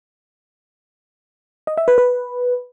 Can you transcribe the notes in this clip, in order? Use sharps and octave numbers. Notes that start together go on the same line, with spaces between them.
D#5
E5
B4
B4